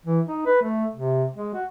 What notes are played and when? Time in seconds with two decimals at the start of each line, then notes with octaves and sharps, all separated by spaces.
0.06 E3
0.27 D#4
0.46 B4
0.62 A3
0.95 C3
1.34 G#3
1.54 F#4